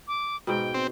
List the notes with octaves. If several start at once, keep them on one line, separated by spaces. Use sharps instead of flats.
D6
G#2 B2 G5
C4